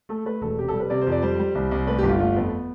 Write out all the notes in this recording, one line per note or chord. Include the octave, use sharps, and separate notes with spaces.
A3 A4
A3 B4
E1 A4
C3 G4
A4
G3
B4
C3 D5
C5
F2
D5
G3 C5
G3
C2
C2
A3 B4
G4
G1
F4
A3 F4
F2 B3